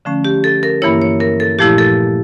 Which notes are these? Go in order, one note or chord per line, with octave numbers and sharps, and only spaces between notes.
D3 F3 A3 C#4
G4
A4
A#4
G2 E3 A#3 E4 C#5
C#5
A#4
A4
A#2 F3 A3 E4 G4
A4